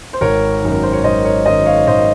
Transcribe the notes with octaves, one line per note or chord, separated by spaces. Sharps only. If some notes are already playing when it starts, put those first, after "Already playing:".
C5
G#1 A#4 C#5
F#2 D#3
A#4
C5
C#5
G#1 C5 D#5
A#4 C#5
F#2 D#3 C5 D#5
C#5 F5
G#1 C5 D#5